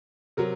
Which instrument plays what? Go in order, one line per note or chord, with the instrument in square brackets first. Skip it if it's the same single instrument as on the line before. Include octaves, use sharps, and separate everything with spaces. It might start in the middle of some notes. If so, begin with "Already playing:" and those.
[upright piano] C3 F#3 A#4